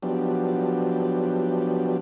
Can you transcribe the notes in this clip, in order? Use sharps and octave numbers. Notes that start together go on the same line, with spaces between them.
F3 F#3 B3 D4 G4